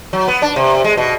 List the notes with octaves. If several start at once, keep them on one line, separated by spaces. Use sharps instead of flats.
F#3
B3
D4
C3
G#3
B2